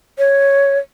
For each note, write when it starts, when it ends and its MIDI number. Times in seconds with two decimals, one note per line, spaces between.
0.19 0.78 73